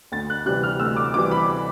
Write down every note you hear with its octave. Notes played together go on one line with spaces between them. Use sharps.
D2 A6
F#6
C3 E3 G3 F#6
F6
D2 E6
D6
C3 E3 G3 D6
B5